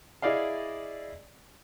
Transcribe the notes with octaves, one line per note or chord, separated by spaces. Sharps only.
E4 G#4 D5 D#5 F5